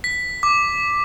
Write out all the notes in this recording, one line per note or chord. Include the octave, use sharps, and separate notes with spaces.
B6
D6